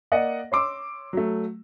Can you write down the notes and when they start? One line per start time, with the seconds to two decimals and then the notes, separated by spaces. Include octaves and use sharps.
0.12 A#3 D5 D#5 F#5
0.52 C#5 C6 D6 E6
1.13 F#3 A3